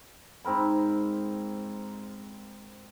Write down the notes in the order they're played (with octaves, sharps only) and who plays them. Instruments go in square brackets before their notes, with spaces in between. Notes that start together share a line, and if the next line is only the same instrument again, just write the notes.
[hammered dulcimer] G#2 C4 A#4 B5